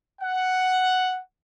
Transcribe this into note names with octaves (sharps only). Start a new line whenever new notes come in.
F#5